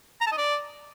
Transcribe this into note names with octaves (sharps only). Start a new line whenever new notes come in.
A#5
A5
D#5
D5